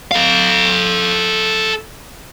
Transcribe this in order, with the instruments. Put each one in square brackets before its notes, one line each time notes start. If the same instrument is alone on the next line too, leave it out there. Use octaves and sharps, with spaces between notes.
[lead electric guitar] A4 F5